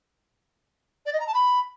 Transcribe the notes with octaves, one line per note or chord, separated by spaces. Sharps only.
D5
D#5
A#5
A5
B5